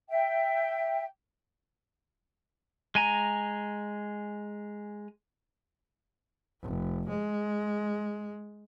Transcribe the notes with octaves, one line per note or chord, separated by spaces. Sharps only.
E5 G5
G#3 G#5 A#5
F1
G#3